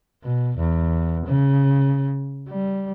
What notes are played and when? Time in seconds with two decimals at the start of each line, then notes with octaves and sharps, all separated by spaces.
0.23 B2
0.58 E2
1.27 C#3
2.49 G3